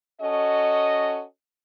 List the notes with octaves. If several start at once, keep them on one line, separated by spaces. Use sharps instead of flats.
C#4 F#4 A4 D#5